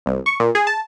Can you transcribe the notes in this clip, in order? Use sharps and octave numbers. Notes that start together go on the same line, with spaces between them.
C2
C#6
A#2
G#4
A5